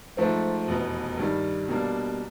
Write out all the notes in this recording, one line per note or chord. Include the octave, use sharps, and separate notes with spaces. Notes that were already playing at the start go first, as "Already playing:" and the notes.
G#2 F3 A3 C4
F1 E2 B2
G2 D#3 G3
B2 G3 A#3 D4